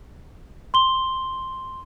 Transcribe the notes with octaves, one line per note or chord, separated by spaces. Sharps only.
C6 G7